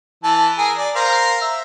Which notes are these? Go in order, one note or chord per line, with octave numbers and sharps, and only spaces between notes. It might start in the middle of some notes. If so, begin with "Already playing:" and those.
E3 A5
G#4 A#4 G#5
D5
A#4 C5 F5
E5